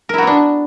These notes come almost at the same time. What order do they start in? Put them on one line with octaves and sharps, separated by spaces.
A#4 E4 F#4 B3 D4